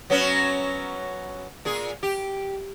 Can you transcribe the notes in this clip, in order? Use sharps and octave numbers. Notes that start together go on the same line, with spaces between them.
F#3 B3 C#4
A#2 G#4
G4